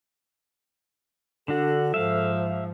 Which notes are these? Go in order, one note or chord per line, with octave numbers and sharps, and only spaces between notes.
D3 D4 F#4 A4
G#2 F3 E5 F5